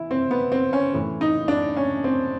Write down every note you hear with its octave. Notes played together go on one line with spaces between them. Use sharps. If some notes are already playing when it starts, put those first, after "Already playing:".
Already playing: E3 E4
C4
B3
C4
C#4
A2 E3
D#4
D4
C#4
C4